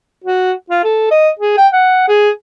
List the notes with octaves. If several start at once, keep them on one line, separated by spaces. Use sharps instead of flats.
F#4
F4
A4
D#5
G#4
G5
F#5
G#4